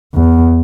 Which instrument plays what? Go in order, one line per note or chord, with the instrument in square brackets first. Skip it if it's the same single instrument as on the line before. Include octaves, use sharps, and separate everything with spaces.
[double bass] E2